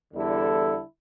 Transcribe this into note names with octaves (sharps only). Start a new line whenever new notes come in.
E2 D3 G3 E4 A4